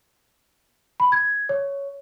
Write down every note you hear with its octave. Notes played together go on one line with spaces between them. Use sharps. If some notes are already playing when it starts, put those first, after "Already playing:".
B5
G#6
C#5